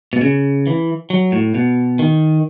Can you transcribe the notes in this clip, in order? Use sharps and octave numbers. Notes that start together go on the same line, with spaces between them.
B2
C#3
E3
F#3
A2
B2
D#3